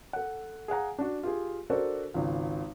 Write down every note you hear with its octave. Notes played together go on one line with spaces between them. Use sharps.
A4 F#5
G#4 F5 F#5 A#5
D4 F#4
F4 G4 G#4
D4 F#4 A4 A#4 C5 D5
G#1 C#2